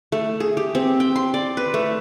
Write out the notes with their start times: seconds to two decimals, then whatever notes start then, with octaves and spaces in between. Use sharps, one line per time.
0.12 A3
0.40 G#4
0.57 G4
0.75 C4
1.00 G5
1.16 C6
1.34 D5
1.57 B4
1.74 A3